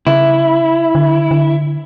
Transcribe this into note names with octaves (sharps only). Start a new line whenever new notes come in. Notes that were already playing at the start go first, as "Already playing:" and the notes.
C#3 E4
D3
D3